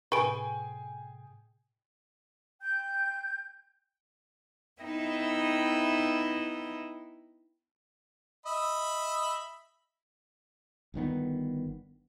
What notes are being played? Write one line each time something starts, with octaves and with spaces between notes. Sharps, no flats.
A2 C3 G#4 B4 G5 G#5 C#6 D7
G5 G6
B3 D#4 E4 E5 G5
D#5 E5 B5
G1 G2 D#3 B3